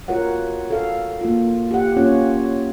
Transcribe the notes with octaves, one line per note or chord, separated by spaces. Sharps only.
F4 F#4 A#4 C#5 F#5
A4 F5
A#3 F4
G4 F#5
A#3 C#4 F4 C#5